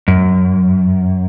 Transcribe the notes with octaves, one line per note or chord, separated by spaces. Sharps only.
F#2